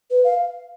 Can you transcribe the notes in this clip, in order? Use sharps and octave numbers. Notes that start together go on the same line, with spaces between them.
B4
F5